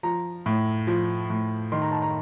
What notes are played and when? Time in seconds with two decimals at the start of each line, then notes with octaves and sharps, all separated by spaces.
0.03 F3 A#5
0.46 A2
0.87 F3
1.30 A2
1.72 D#3 C6
1.82 A#5
1.92 A5
2.02 A#5